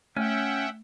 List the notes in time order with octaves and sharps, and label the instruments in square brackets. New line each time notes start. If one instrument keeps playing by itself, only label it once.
[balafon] A3 [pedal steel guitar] C#4 [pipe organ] E5 F#5 G5